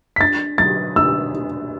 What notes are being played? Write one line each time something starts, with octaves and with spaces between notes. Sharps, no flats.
B6
D4 A6
F#3 A6
D4 E6
D4